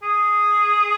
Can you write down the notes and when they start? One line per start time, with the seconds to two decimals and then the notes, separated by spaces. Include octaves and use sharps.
0.03 G#4